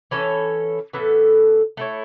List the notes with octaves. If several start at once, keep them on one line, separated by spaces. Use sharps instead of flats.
E3 C#4 A4 C#5
A2 E3 B3 A4
A3 E4 C#5